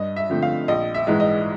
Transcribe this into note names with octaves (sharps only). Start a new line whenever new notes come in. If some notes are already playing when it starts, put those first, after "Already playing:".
Already playing: G2 D#5
E5
D3 F3 A3 C4
F5
A#1 D#5
E5
G#2 E3 G#3
D#5